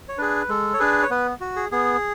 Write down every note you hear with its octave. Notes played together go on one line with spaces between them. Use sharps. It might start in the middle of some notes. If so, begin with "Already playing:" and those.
C#5
D4 G#4 B4
G#3 A4
C#5
D4 G#4 B4
C#5
B3 B4
F#4
G#4
B3 G#4